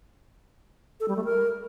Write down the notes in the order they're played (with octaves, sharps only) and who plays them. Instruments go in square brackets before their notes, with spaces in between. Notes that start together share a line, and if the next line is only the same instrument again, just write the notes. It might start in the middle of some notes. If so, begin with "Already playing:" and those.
[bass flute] A4
G3
A3
A#4